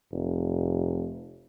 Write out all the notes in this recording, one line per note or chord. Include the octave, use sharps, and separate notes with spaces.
F1